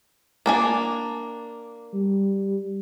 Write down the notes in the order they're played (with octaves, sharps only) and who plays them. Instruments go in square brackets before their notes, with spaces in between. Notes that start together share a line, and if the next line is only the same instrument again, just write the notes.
[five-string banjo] A#3 D4 G#5
[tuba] G3